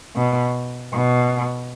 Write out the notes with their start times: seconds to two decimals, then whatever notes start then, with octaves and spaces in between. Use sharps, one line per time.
0.15 B2
0.93 B2